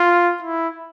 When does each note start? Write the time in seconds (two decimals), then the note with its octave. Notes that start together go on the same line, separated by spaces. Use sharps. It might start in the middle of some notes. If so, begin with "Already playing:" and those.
Already playing: F4
0.42 E4